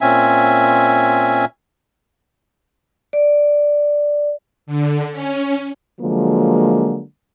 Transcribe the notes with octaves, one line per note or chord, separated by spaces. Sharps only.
A#2 C4 C#4 E5 G#5
D5
D3
C#4
D3 F3 F#3 G#3 A#3